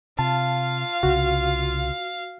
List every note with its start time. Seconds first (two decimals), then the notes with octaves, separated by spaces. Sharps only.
0.19 C3 F4 F5 A5
1.03 C2 C#3 F#4